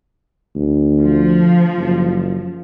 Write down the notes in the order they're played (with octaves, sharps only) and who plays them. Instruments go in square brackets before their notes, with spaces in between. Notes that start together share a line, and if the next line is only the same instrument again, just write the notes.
[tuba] D2
[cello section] F3
[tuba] F#1